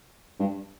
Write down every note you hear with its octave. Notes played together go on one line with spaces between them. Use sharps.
G2